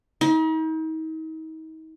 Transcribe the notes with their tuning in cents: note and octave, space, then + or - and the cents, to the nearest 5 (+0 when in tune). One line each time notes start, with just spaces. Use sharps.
D#4 +40